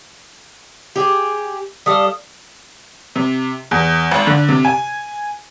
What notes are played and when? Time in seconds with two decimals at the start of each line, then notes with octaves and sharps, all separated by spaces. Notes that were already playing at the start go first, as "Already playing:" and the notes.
0.96 G4 G#4
1.86 G3 A4 F5 D#6
3.16 C3
3.71 E2
4.11 G#1
4.27 D3
4.49 C3
4.65 G#5